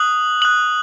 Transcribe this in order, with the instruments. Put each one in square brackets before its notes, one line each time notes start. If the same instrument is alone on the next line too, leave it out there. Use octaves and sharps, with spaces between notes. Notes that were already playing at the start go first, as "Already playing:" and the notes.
Already playing: [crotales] D#6 F#6 F#7
D#6 F#6 F#7